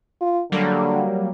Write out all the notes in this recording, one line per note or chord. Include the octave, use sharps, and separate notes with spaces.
F4
D3 F#3 G3 A#3